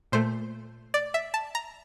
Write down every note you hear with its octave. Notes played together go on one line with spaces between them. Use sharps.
A#2 A3 C5
D5
E5
A5
A#5